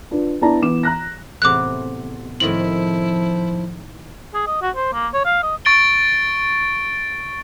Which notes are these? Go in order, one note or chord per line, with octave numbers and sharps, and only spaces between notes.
D4 F4 B4
B3 D4 E4 D5 A5 A#5
E3 B3 D6 E7
A#5 F#6 A#6
E2 A2 C3 D6 F#6
A2 D#3 F3 C4 E4 F#7
G#4
D#5
F#4
C5
A#3
C#5
F5
D#5
C#6 A6 D7 G7